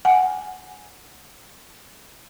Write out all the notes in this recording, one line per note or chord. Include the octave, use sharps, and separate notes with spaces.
F#5 G#5